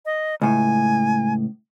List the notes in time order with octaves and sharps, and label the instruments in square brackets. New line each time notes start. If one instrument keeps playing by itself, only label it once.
[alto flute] D#5
[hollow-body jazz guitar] C#2 A2 [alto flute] G#5